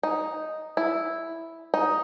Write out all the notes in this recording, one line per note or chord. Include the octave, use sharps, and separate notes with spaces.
D#4
E4
D#4